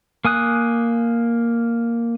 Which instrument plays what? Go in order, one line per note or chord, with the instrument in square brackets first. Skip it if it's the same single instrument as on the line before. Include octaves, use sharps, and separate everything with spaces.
[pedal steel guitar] A#3 G#5 D#6 F#6